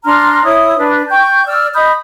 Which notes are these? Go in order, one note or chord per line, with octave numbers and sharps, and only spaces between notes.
D4 A#5 C6 F6
E4 C#5 D#6
D4 B4
G5 C#6 G6
D5 E6 F6
D#5 B5 D#6 G6